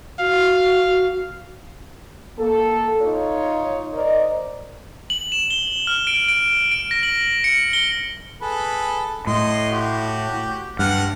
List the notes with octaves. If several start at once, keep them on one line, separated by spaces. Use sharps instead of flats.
F#4 F5
A#3 A4
D#4 F4 C#5
A#4 C5 D5 D#5
F#7
E7
G7
F6
D7
D7
D7
A#6
F#7
C#7
G7
G#4 A4 B4
A2 D#5 C6
F#4 G4
G2 F#5 F6